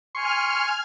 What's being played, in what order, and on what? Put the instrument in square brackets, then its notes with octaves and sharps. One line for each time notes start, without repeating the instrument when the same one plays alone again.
[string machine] G#5 F6 [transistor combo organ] C6 C#6